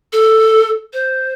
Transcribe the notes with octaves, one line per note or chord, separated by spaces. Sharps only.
A4
C5